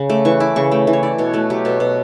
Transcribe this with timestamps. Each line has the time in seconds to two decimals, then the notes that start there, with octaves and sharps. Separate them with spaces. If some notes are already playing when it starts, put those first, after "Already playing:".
Already playing: C#3
0.10 A3 D6
0.25 E3 C#6
0.40 E4 D6
0.56 C#3 C#6
0.71 A3 G5
0.87 E3
0.93 C#5
1.03 E4 D5
1.18 B2 C#5
1.33 A3 F#4
1.50 F#3 G4
1.65 B2 A4
1.80 B2